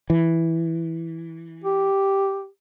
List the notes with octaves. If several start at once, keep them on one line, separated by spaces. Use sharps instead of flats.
E3
G4